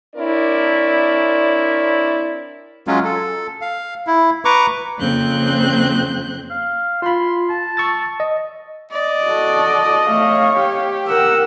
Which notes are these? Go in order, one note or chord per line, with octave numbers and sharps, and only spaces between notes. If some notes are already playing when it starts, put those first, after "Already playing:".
C4 D4 E4 A#4 C#5 D5
F#3 G#3 C#4 F4
A4
F5
E4
B4 A#5 C#6 D6
F2 C#3 A#3 C4 F#6 G6
F5
F4 B5 C6
A5
C#6 E6 A6
D#5
D5 D#5
F#4 A4
A3 C#5 F5
G4
A#4 F#5 E6